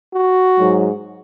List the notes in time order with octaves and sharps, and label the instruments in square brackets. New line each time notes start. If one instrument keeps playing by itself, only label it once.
[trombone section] F#4
G#2 F#3